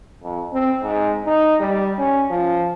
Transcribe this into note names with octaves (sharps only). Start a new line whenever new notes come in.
F2
C4
G#2
D#4
G3
C#4
F3